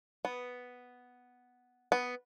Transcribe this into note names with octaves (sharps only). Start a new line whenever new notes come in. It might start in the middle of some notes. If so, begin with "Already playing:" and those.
B3
B3